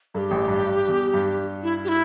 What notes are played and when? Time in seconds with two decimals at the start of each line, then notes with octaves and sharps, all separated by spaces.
0.15 G2 A4
0.18 G4
0.31 A1 A2
0.48 G2
0.64 G2
0.88 E2
1.14 G2
1.63 E4
1.84 G4
1.88 E4